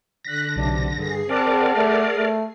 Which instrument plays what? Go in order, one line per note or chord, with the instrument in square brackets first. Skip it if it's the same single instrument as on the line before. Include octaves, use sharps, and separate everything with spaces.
[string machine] D3 [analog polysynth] F#6 B6 [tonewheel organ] A#6
[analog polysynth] B1 C3 D4
[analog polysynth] G2 D3 [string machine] G#4 C7
[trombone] C4 [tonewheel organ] A#4 D5 [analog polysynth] F#5 A5 D6
[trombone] A3
A3